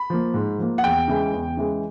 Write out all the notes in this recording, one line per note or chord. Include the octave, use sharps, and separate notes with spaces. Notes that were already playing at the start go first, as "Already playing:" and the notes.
Already playing: B5
F3 A#3
G#2
F3 A#3
F#5
E2 G5
C#3 E3 G#3
E2
C#3 E3 G#3